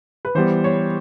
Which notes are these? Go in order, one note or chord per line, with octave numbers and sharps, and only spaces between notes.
B4
E3 G3 B3 C5
C#5